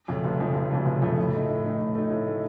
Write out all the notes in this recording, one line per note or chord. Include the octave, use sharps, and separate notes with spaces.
F2 C#3 F3 A3
F1
F2 C#3 F3 A3
F1
F2 C#3 F3 A3
F1
F2 C#3 F3 A3
A2
A3 D#4
A2
A3 D#4
A2
A3 D#4
A2
A3 D#4